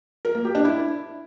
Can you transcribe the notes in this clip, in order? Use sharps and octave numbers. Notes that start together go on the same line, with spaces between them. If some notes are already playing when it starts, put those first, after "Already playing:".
A#4
A#3
G4
D4
E4